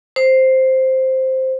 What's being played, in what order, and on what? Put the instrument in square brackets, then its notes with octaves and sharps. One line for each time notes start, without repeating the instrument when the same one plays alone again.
[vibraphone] C5